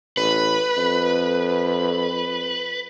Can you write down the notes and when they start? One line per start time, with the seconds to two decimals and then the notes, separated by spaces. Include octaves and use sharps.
0.17 A1 B4
0.78 F2